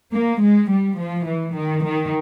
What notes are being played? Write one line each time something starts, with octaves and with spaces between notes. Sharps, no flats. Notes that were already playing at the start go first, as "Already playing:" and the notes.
A#3
G#3
G3
F3
E3
D#3
D#3